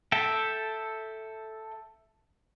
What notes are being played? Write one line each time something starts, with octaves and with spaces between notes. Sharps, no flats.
A4 E5 G5